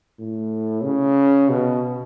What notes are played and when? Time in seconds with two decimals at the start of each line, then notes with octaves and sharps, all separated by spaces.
0.19 A2
0.84 C#3
1.49 B2